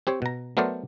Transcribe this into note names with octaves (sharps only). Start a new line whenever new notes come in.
C4 G4 C5 C#5
B2 A#5
F#3 A3 B3 A#4 C5 D5